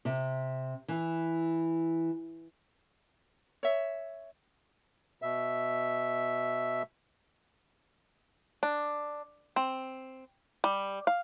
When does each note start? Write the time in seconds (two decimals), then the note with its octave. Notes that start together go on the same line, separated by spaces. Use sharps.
0.05 C3
0.88 E3
3.63 C#5 E5
5.22 B2 E5
8.63 D4
9.56 C4
10.64 G3
11.07 F5